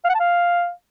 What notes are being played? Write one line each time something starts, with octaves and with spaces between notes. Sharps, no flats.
F5
F#5
A5
F5